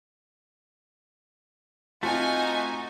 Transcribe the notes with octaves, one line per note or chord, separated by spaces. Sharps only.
A3 C4 D#4 F4 F#4 G#5